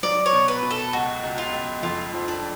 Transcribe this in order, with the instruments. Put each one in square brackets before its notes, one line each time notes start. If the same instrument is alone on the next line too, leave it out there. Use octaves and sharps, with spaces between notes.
[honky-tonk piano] F#3 [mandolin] D5
[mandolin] C#5
[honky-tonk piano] B2
[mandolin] B4
[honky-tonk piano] B2
[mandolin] A4
[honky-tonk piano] C#2 [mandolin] F#4
[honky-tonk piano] C#2
[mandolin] F4
[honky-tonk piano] C#2
[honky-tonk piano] F2 [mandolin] F4
[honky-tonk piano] F3
[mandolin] D4